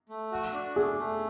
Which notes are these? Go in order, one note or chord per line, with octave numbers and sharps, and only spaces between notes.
A3
F#4
D4
A3 G#4
A3